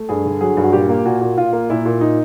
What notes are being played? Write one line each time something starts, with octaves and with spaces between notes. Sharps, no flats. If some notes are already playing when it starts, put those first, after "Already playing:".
Already playing: A3
G2 G#4
D3
F#3 G#4
G2
F#4
A#2 G4
A#3
A#2 F#4
A#2
A#2 F4
A#3
A#2 E4
A#2
D#4